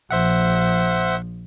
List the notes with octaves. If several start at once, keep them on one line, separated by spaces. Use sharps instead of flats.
A#1 F3 C5 E5 F#5